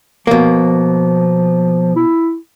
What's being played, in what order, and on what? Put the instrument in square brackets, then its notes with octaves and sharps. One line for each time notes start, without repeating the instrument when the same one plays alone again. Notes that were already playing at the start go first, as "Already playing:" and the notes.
[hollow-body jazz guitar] B2 A#3 [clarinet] F3
[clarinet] E4